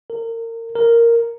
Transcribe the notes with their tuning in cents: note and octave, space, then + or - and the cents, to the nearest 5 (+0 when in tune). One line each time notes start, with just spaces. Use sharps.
A#4 -30
A#4 -5